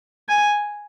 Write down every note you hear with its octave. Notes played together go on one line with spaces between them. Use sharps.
G#5